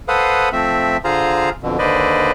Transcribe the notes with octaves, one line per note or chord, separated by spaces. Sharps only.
A4 B4 C5 F5 F#5 D#6
F3 A3 C4 E5
D3 F4 G#4 C5 F5 A#5
F2 B2 D3
D#2 D3 B4 C5 D5 D#5